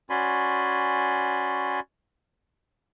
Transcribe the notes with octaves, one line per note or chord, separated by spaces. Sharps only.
C#4 F#4 D5 G#5 B5 C6